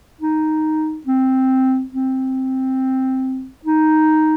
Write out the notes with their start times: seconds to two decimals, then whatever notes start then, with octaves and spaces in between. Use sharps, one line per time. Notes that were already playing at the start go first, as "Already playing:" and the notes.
0.21 D#4
1.06 C4
1.93 C4
3.65 D#4